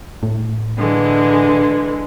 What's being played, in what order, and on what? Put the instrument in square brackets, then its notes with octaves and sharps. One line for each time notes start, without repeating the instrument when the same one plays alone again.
[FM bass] A2
[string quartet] D3 E3 G#3